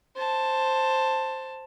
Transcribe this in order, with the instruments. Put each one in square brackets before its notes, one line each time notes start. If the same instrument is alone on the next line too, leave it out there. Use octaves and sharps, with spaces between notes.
[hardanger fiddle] C5 A5